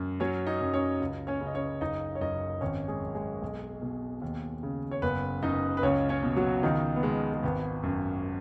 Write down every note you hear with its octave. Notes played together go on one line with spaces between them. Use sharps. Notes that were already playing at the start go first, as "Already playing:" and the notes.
Already playing: F#2
F#3 C#4 C#5
D#4 D#5
F#2
C#4 C#5
C#2
C#4 C#5
C#3
D#5
C#4 C#5
F#1 D#4 D#5
C#5
F#2 D#4 D#5
G#1 C#4 C#5
G#3 G#4
F#2
G#3 G#4
B1
B2
D#2
C#3
C#5
F#1 B3 B4
F#2 D#4 D#5
B4
C#2 C#4 C#5
C#4 C#5
B2
F#3 F#4
C#2 D#3 D#4
B3
B2 G#3
G#3
G#1 B3
F#2